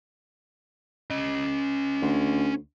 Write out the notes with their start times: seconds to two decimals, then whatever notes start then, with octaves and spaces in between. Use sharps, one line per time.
1.10 C#4 D#5
2.02 D2